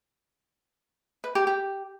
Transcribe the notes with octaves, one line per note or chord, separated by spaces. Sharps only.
B4
G4
G4